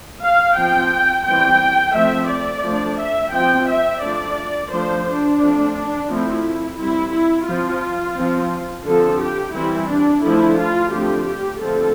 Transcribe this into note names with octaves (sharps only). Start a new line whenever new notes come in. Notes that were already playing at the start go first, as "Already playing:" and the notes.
F5
F3 C4 G5
E3 G3 C4 G5
F3 A3 C4 E5
D5
F3 A3 D4
E5
F3 C4 G5
E5
F3 A3 D4 D5
F3 A3 D4 C5
D4
F3 A3 C4
F3 A3 C4 E4
G3 C4 E4
E4
F3 C4 F4
F3 C4
D3 F3 C4 A4
G4
E3 G3 C4 E4
D4
D3 F3 A3 D4 E4
F4
D3 F3 A3 C4 G4
G4
D3 F3 A3 C4 A4